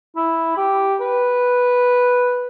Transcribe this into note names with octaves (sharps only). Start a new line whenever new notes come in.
E4
G4
B4